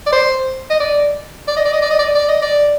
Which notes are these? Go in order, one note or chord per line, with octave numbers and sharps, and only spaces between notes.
D5
C5
D#5
D5
D5
D#5
D5
D#5
D5
D#5
D5
D5
D#5
D5